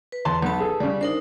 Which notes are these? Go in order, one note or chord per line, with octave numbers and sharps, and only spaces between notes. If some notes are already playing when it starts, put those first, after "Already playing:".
B4
E2 A5 C6
B1 B3 B4 A5
G#4 A4
C#3 G3
D4 D#4 A#4 C5